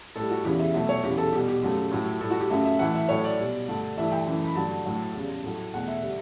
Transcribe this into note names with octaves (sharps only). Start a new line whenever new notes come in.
A2 G3 A4
F#4
E2 C#3 E3 G4
E5
B2 F#3 A3 E5
C#5
E2 C#3 E3 G4
A4
B2 G3 G4
G4
F#2 C#3 F#3 A3
A2 F#3 A3
A2 G3 A4
F#4
G4
F#2 C#3 F#3 A3 E5
E5
A2 E3 A3 F#5
E5
A2 F#3 A3 C#5
D5
B2 G3
G2 D3 A3
G2 E3 A3 E5
G5
F#2 E3 A3
B5
G2 D3 F#3 A3 A5
A2 F#3 A3
E2 C#3 G3
A2 F#3 A3
E2 B2 A3 F#5
E5
D3 G3